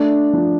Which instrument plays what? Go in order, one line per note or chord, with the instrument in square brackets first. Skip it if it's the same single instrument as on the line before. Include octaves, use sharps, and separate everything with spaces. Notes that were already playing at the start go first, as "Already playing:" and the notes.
Already playing: [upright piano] A3 [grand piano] D4
[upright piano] F3